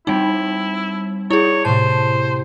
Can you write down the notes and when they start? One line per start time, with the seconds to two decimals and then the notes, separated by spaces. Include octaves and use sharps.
0.07 G3 C4 D#4 E4 G5 B5
1.31 E4 G#4 C#5
1.65 A2 C3 C5 A5